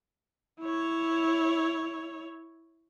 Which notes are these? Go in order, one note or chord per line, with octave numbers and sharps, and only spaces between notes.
E4 C#5